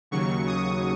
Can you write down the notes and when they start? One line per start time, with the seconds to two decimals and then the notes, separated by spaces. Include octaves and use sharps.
0.11 D#2 C#3 F#3 C#6
0.47 D#6